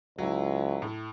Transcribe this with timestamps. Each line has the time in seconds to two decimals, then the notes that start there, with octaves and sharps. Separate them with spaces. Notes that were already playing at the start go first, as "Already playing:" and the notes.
0.18 C#2 F#3 E4
0.82 A2